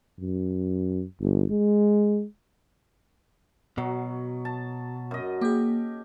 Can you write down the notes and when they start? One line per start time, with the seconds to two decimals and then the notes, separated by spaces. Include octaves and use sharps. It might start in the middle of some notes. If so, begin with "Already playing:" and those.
0.19 F#2
1.21 G1
1.51 G#3
3.78 B2 F#3
4.45 A5
5.11 F#2 D#5
5.41 A#3 G4 G#4